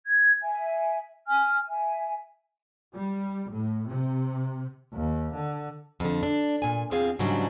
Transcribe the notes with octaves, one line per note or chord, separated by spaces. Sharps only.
G#6
E5 G#5
G#5 F6
E5 G#5
G3
A2
C3
D#2
D3
F2 D3
D4
A#2 G#5
E2 C4 F4 G#4 F5
G#2 C#3 E3 F#3 G3 D4